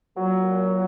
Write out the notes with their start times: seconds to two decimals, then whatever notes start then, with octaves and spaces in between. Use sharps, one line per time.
0.16 A#2 F#3
0.43 A#2
0.69 A#2